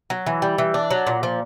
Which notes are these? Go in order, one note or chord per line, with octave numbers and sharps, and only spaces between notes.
F#3
E3
G3
E3
D4
F#3
A#2
F3